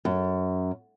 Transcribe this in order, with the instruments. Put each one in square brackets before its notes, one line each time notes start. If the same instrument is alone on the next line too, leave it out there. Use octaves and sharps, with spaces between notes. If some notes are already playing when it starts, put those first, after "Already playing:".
[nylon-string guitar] F#2